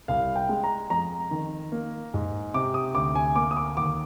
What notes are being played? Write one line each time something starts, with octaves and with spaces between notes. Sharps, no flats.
C2 F5
G5
G#3
A#5
F2 A#5
D#3
A#3
G#2
C3 D6
D#6
D2 D6
G#5
A#3 D6
D#6
D6
D#2 D6